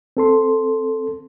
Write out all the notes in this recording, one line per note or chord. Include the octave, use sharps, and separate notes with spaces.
C4 A4 C6